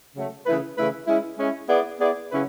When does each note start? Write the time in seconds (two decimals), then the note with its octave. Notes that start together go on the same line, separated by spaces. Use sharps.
0.15 C#3 F#3 A3
0.46 C#3 E3 A3 E4 B4
0.77 C#3 E3 A3 E4 B4
1.07 G#3 C#4 E4
1.38 G#3 C#4 E4
1.69 B3 E4 G#4 D5
1.99 B3 E4 G#4 D5
2.31 C#3 F#3 C#4 E4 B4